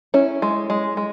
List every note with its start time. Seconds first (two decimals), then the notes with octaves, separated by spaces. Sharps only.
0.14 C#4 E4
0.42 G#3
0.70 G#3
0.97 G#3